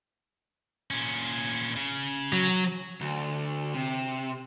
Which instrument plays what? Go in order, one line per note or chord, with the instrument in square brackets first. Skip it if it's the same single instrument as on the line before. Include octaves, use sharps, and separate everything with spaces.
[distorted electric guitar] A#2 C#4
C#3
[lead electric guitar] F#3
D2
C3